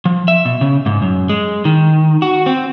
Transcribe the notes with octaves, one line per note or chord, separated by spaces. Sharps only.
F3
E5
B2
C#3
G#2
F#2
G#3
D#3
F#4
C4